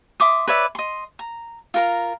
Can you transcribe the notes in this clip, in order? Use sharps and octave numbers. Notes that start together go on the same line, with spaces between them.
E5 C6 D6 D#6
B4 C#5 D5 E5
D#5 C6
A#5
F4 A#4 A#5